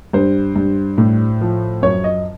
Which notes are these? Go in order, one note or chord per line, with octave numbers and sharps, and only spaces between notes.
G2 C5
G2
A2
F3
F#2 C#5
D#5